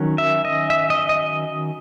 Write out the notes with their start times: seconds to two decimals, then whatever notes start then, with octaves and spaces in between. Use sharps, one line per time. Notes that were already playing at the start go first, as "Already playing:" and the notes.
Already playing: D#3 F#3 C#4
0.18 E5
0.45 D#5
0.70 E5
0.90 D#5
1.09 D#5